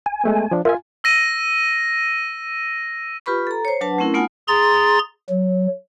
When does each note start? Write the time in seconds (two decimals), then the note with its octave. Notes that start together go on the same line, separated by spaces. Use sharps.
0.06 G#5
0.24 G#3 A3 B3
0.51 F3 D4
0.65 F4 A#4 E5 G#5
1.04 E6 A#6 D#7
3.26 F4 G4 B4 B5 C#6
3.47 A4 A#5
3.65 C5 C#5
3.81 F#3 D4 B4 F#5 A5
3.98 A3 C4 C#4 E4 A#4
4.14 A3 B3 D#4 F4 F#5 G#5
4.48 G#4 A#5 C6 A6
5.30 F#3